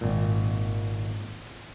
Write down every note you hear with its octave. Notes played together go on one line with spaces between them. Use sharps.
G#1 A#2